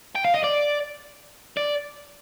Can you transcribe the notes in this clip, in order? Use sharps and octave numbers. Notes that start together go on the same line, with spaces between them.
G5
F5
D#5
D5
D5